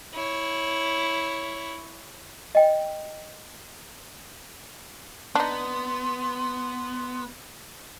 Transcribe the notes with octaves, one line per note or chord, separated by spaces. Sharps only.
E4 C#5
D#5 G5
B3 D4 D#4 C6